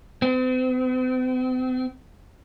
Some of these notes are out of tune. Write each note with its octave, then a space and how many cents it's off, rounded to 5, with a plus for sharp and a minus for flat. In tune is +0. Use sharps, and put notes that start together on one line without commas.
C4 -45